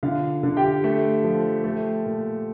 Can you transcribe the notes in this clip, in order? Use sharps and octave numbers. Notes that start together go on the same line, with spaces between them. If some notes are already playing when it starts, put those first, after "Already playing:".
D3 F4 F5
D3
G4 G5
A3
F3
A3
A#2